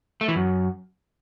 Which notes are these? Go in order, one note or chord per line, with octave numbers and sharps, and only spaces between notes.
A3
E3
F#2